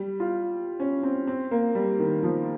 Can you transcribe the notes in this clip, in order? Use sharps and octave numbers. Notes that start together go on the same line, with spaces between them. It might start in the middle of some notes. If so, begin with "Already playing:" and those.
Already playing: G3
F4
C#4
C4
C4
A#3
G3
D#3
F3